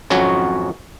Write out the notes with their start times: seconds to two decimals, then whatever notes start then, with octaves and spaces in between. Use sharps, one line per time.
0.10 G#1 F2 F#3 C#4 F#4 C#5